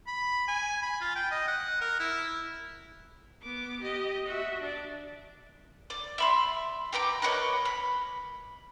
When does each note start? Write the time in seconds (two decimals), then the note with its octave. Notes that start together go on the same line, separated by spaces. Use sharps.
0.07 B5
0.48 G#5
0.82 B5
1.01 F4
1.15 G5
1.31 D#5
1.48 F#5
1.81 A#4
2.00 E4
3.42 B3 D6
3.80 G4 D#5
4.26 F#4 E5
4.60 D4 D5
5.90 D5
6.18 E5 B5 C6
6.93 G4 B4 A#5 D6
7.22 A#4 B4 C#5 D#5
7.65 B5